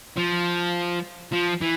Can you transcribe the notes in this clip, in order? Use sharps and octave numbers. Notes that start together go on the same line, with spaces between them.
F3
F3
E3